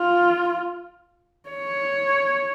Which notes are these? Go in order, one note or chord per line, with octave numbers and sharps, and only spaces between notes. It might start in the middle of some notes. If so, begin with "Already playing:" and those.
Already playing: F4
C#5